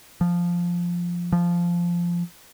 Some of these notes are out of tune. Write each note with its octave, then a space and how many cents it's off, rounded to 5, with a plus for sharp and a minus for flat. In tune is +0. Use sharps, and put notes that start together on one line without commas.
F3 +0
F3 -10